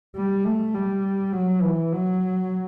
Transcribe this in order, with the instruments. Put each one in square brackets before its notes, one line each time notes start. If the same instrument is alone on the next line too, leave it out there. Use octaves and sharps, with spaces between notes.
[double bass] G3
A3
G3
F#3
E3
F#3